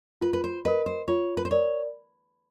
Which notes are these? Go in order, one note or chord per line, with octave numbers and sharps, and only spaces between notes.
F4 B4
B4
C5
A#4 B4 D#5
C5
F4 C#5
B4
C5
A#4 C#5 D5